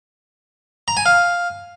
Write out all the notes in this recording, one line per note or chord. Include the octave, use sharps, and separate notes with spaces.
A#5
G#5
F5